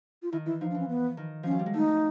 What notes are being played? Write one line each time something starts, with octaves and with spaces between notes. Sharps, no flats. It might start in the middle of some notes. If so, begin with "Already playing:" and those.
F4
D#3 E4
E3 E4
F3 D#4
D4
E3
C#4
B3
D#3
F3 C#4
F#3
G3
G#3
A3 D#4